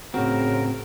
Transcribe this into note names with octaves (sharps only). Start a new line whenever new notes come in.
A2 C#3 C4 F#4 A#4